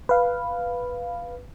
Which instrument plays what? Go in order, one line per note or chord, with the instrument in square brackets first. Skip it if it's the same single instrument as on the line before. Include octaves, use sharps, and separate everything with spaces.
[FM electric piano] B4 F5